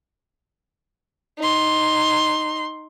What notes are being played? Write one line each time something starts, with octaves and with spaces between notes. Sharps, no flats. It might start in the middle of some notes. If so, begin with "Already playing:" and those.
D#4 C6